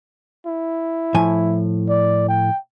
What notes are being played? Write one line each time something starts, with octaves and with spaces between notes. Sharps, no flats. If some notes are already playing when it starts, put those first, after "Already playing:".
E4
A2 F3 G#5
D5
G5